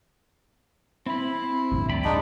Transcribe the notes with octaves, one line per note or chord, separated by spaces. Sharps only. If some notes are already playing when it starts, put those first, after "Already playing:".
C4 E4 B5
C4
A1 D2 G2
D5 G5 B5
G#3 D4 D#4